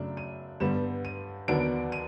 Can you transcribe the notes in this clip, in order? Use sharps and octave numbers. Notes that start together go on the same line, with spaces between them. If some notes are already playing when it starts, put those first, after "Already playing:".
Already playing: F#2 C#3 F#3 A3 D4
D#7
G2 D3 G3 B3 E7
D#7
D#2 D3 F#3 B3 D4 D7
D#7